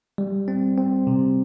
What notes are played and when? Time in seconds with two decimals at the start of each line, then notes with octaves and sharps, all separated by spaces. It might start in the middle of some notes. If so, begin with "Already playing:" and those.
0.18 G3
0.48 C4
0.78 C4
1.07 C3